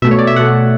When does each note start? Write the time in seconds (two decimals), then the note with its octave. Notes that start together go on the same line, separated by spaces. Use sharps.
0.02 B2 A3 E5
0.11 C#5
0.19 D5
0.27 E5
0.36 B2 A3 F#5